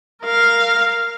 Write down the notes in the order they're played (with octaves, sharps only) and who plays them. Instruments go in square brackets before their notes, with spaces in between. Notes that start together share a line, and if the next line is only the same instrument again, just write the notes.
[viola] A#4 F5